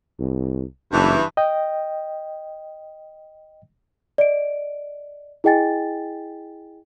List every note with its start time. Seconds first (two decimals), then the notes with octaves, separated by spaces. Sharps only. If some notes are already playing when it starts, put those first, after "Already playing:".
0.19 C2
0.92 F#1 G2 E3
1.37 D#5 G5
4.18 D5 D#5 D7
5.44 E4 G#4 D#5 G5 G#5 A6